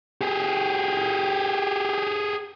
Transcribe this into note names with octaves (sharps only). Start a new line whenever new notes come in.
G4 G#4